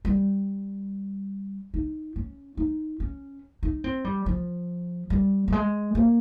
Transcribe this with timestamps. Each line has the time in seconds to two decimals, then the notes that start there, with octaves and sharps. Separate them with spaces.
0.05 G3
1.74 D#4
2.16 C#4
2.57 D#4
3.00 C#4
3.63 D#4
3.84 C4
4.04 G3
4.26 F3
5.10 G3
5.48 G3
5.52 G#3
5.95 A#3